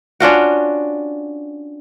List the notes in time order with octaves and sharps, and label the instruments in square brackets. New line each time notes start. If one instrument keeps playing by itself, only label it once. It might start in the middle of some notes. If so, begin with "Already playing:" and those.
[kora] C#4 D4 F4 F#4